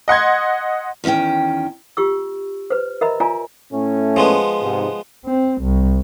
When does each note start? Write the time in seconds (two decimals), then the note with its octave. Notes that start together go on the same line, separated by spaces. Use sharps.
0.08 D#5 F#5 C6 G#6
1.04 E2 D#3 E3 C#4 G5
1.97 F4 G4 C#6 E6
2.70 B4 C5
3.01 A#4 D#5 E5 A#5 B5
3.20 F4 D5 E5 G#5 A#5
3.73 A2 A3 C#4
4.16 F3 G#3 B3
4.63 G#2 C3
5.25 C4
5.62 C2